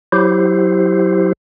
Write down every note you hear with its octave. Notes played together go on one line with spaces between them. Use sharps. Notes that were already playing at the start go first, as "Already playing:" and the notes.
F#3 E4 G4 C5